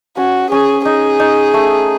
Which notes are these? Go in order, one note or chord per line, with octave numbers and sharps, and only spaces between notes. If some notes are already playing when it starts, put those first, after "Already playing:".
C#4 F#4
C#4 G#4
D#4 G#4
D#4
A3